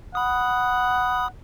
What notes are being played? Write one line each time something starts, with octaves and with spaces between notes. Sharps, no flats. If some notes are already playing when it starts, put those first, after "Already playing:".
F#5 B5 D#6